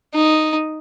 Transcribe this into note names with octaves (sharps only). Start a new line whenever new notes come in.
D#4